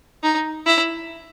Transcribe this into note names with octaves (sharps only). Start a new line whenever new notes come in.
D#4
E4